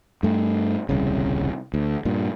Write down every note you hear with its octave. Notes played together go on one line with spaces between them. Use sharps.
G2 A3
D#1 C2 C#3
D2
G2 A#2